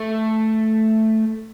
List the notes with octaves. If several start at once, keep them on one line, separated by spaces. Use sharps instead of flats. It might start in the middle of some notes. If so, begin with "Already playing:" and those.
Already playing: A3